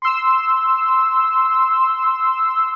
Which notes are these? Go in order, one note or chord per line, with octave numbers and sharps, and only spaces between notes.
C6 E6